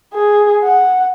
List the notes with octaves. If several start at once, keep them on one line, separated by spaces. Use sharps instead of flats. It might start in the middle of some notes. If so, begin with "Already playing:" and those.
G#4
F#5